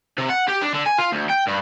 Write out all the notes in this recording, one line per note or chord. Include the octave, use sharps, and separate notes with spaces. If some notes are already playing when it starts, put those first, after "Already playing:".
C3
F#5
G4
D4
D3
G#5
F4
D2
G5
G2